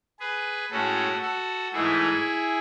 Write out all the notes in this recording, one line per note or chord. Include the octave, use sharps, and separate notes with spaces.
G#4 B4
A2 G#3 C#4 F#4 A4
F#4 A4
G#2 E3 A3 D#4 E4 G#4